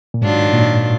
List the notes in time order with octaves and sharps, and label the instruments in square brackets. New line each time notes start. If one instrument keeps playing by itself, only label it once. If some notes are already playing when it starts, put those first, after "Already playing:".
[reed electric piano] A#2
[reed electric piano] G#2 [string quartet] D#3 F#3 D4 F4
[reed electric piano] A#2